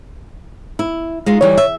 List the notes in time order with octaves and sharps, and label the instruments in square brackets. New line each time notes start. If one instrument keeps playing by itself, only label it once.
[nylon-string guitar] E4
G#3 D#4 F4
[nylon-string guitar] D3 E3 G3 [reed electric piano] C#5
[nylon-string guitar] E5